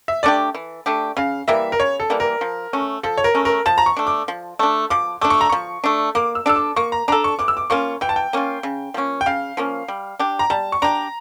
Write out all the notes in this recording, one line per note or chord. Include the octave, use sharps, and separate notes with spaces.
E5
A3 D4 G4 D5
E3
A3 D4 G4
C#3 F5
E3 G3 A#3 E5
A#4
C#3 C#5
A4
E3 G3 A#3
A#4
F3
A3 C#4
F3 A4
C#5
A#4
A3 C#4
A#4
F3 A5
A#5
C#6
A3 D4
D6
F3
A3 D4
F3 D6
A3 D4 D6
C#6
A#5
F3 C#6
A3 D4
A#3 D6
E6
D4 A4 E6
D6
A#3 C#6
A#5
D4 A4 A#5
C#6
E3 D6
E6
D6
A#3 C#4 F4 C#6
E3 G5
A5
G5
A#3 C#4 F4
C#3
F3 A#3 C#4
G5
C#3 F5
F3 A#3 C#4
G3
D4 G4
A#5
G3 A5
C#6
D4 G4 A#5